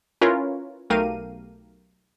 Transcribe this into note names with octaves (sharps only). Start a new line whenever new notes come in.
C#4 E4 F4 A#4 B4 C#5
B1 A3 G4 A#4 F5 D#7